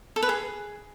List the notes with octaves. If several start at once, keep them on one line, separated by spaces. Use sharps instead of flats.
A4
B4
G#4